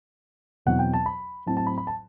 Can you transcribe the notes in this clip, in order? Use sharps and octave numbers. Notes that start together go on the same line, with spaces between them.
E2 B2 F#3 C4 E4 F#5
G5
A5
B5
A2 F#3 C4 E4 A5
A5
B5
B5
A5